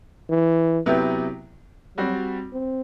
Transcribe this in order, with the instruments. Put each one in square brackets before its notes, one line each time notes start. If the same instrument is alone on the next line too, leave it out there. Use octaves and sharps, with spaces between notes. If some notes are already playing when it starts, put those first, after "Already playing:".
[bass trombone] E3
[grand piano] C3 F#3 B3 E4 G4
[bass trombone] F#3 [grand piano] G3 C4 F#4
[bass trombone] C4